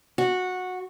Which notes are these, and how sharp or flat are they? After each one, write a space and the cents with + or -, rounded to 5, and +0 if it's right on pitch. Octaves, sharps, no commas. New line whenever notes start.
F#4 -15